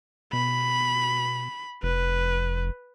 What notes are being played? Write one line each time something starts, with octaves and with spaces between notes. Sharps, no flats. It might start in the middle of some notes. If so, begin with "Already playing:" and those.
B2 B5
F1 B4